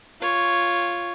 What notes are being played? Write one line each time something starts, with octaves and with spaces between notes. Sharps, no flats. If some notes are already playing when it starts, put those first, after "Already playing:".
F4 C#5